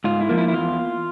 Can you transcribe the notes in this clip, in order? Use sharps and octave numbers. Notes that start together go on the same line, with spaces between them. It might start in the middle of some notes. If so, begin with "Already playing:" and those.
G#2 F4
E4
F3 A#3
E4
E4
E2 F4